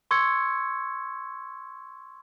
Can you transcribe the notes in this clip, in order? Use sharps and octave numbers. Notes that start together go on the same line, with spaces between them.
C6 C#6 E6 G#6 C#7